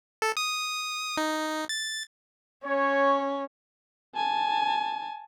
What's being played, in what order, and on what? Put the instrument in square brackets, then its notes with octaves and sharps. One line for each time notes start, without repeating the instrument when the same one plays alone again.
[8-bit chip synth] A4
D#6
D#4
A6
[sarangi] C#4 [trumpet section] C#5
[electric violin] G#5 A5